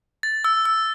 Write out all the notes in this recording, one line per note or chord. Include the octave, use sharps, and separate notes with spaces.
A6
E6
E6